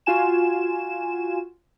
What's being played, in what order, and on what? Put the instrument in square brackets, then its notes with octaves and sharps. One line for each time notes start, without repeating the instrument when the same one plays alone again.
[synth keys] F4 F#4 G#5 E7